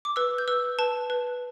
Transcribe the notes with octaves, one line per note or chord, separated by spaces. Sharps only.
D6
B4 E6
G6
B4 E6
B4 A5
B4